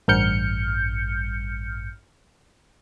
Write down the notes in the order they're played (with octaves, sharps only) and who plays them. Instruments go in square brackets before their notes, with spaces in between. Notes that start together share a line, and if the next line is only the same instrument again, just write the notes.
[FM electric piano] A1 G2 F6 G6 C#7